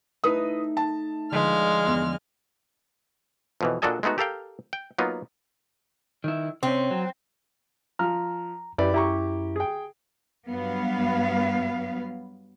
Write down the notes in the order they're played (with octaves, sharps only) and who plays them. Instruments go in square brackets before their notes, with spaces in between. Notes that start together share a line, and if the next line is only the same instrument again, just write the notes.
[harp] A3 D#4 [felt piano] E4 B4 D#6
[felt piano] A5
[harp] D3 F3 B4 [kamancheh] G#3 F6
[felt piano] E2
[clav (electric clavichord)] F2 B2 E3
A#2 D4 F#4 A4 D#5 G#5
G#3 A3 B3 D#4 F#4
G4 A4 A#4 F5 G5
G5
F#3 A#3 B3 D#4 F4
[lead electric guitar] D#3 E4
[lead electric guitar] C3 C#4 [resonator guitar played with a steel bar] C4
[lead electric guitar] F#3
[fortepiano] F3 F6 [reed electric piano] A#5
[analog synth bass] F#2 [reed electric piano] E4 B4 B5 [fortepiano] G4 D5
[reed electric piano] E4 [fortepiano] G4 A#5 C#6
[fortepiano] G#4 G5
[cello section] G2 F#3 B3 B4 F5